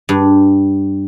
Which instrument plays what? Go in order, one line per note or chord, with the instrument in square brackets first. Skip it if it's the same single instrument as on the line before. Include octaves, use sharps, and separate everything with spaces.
[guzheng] G2